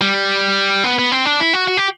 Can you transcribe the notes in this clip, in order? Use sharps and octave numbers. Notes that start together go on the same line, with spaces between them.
G3
B3
B3
C4
D4
E4
F#4
F#4
G4